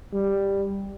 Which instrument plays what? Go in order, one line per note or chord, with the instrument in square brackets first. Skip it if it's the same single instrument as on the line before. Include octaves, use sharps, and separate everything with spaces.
[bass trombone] G3